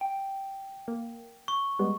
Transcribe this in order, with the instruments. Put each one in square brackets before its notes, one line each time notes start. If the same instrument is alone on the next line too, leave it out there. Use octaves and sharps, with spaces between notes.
[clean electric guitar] G5
[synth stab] A#3
[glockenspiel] C#6
[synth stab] G3 G#3 B3